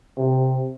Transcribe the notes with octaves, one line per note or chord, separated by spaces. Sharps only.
C3